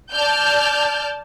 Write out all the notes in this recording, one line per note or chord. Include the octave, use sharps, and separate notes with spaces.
D5 A5 F6 G6